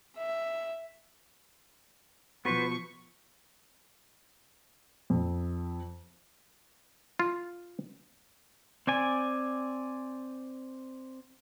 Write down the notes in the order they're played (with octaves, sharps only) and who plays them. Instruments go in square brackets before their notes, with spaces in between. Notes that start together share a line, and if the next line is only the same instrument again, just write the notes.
[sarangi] E5
[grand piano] B2 F3 [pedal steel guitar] B3 B4 C5 [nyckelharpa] C#6
[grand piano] F2
[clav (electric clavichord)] F4
[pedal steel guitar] C4 D5 G#5